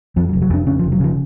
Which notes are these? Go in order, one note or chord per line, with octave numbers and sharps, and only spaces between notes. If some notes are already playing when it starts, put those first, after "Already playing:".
F2 F3
F#3
F1
F#3
F2 D4
C#3 C#4
F3
F1
F#3
C#3 F3